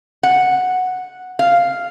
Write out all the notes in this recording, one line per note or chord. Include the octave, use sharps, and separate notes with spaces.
F#5
F5